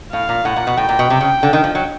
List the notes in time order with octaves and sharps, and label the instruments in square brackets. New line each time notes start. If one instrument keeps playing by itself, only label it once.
[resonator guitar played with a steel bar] A2 [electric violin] F5
[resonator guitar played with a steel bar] A#2
[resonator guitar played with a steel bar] A2 [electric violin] F#5
[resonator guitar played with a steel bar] A#2
B2
[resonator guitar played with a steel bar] A2 [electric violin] G5
[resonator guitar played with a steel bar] A#2
B2
C3
C#3
D3
D#3
F3
F#3